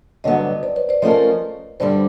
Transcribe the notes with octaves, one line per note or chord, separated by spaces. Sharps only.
G2 D3 F#3 B3 C#5 D#5
C5 D5
B4 C#5
C5 D5
F3 A3 C#4 F4 A#4 C#5 D#5
G2 D3 G3 C5 D5